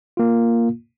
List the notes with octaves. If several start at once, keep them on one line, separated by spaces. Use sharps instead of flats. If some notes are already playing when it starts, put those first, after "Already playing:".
A#3 F4